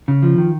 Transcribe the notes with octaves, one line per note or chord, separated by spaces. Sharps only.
C#3
F3
D#3